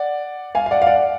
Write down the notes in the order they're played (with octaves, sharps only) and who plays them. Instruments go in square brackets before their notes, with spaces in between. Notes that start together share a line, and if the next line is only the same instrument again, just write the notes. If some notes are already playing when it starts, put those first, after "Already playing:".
Already playing: [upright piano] D5 F#5
F5 G#5
F5
D5 F#5
F5
D5 F#5